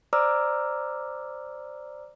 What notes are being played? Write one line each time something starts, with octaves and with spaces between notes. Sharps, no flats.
C5 D5 A#5 D6 E6 F6